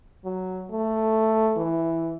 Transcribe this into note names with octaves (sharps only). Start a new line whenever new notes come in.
F#3
A3
E3